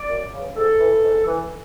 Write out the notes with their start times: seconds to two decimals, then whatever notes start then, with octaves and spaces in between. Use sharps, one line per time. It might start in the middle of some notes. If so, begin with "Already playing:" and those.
Already playing: D5
0.09 F#2
0.33 C#3 E3
0.56 G#2 A4
0.80 E3
1.03 G#2
1.26 E3